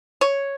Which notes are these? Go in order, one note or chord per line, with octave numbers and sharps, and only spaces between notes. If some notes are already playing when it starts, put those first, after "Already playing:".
C#5